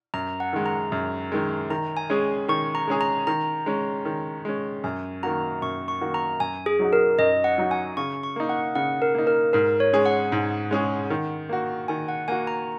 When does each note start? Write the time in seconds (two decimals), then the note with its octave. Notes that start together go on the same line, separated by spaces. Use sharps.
0.14 F#2 A#5
0.40 F#5
0.53 D#3 G#3
0.66 A#5
0.92 F#2
1.32 D#3 G#3
1.70 D#3 A#5
1.97 G#5
2.10 G#3 C#4 G#4
2.48 D#3 C#6
2.75 A#5
2.87 G#3 C#4 G#4
3.01 A#5
3.27 D#3 A#5
3.66 G#3 C#4
4.05 D#3
4.45 G#3 C#4
4.84 F#2 G#5
5.23 D#3 A#3 F#4 A#5
5.62 F#2 C#6
5.88 C#6
6.01 D#3 A#3 F#4
6.14 A#5
6.40 F#2 G#5
6.66 G#4
6.79 F#3 D#4 F#4
6.93 A#4
7.18 F#2 D#5
7.44 F#5
7.58 F#3 D#4 F#4
7.71 G#5
7.97 C#3 C#6
8.23 C#6
8.36 A#3 D#4
8.49 F#5
8.75 C#3 F#5
9.02 A#4
9.15 A#3 D#4
9.27 A#4
9.53 G#2 A#4
9.80 C#5
9.93 G#3 C#4 G#4
10.06 F#5
10.32 G#2
10.71 G#3 C#4 G#4
11.10 D#3
11.49 A#3 F#4
11.88 D#3 G#5
12.08 F#5
12.28 A#3 F#4 G#5
12.47 A#5